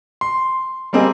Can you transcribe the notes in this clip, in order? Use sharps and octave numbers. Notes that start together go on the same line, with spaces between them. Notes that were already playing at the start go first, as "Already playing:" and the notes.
C6
G3 A#3 C4 G#4 D#5